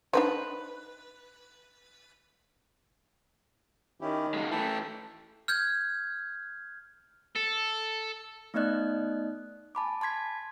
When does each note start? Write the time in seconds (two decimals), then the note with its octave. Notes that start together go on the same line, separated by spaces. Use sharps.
0.13 D4 D#4 B4 C5
4.01 D#3 C#4 E4 G4
4.34 C#3 F#3 G#3 A#3
4.51 E3 A3 E5 G5 A5
5.48 F6 G6 G#6
7.36 A4
8.54 A3 B3 D#4 D5 D#5 F#6
9.75 G#5 A5 B5 D6
10.01 A5 C6 G#6 B6